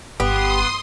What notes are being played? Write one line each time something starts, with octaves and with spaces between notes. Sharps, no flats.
G1 B3 G4 C6 D#6